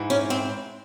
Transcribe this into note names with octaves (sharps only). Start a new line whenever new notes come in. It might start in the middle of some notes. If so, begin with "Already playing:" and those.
Already playing: G#2 E3
C#4
C4